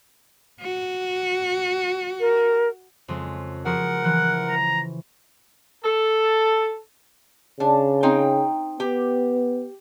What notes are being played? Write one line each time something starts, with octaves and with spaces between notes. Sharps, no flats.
F#4
A#4
F2 C#3 G#3
F3 F#4 G#4 A#4 F#5
E3 F3 F#6
A#5
A4
C#3 D4
C4 D#4 G5
B3 G4